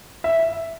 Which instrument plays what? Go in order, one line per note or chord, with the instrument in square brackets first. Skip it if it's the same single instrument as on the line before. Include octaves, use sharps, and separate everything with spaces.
[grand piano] E5